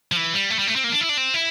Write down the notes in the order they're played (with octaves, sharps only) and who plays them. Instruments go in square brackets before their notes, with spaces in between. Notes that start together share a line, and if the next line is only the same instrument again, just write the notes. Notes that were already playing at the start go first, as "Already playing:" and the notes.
[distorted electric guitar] F3
E3
G3
A3
G3
A3
C4
A#3
D4
E4
D4
C4
E4